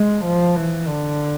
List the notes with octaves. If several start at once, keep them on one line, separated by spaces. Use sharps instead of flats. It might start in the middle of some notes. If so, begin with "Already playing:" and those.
Already playing: G#3
F3
E3
D3